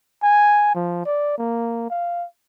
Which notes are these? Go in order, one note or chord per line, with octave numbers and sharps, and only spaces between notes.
G#5
F3
D5
A#3
F5